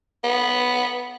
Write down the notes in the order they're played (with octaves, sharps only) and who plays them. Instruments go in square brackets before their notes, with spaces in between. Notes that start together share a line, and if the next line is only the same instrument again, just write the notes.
[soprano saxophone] B3